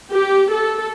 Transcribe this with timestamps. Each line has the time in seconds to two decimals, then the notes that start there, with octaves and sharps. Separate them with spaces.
0.12 G4
0.51 A4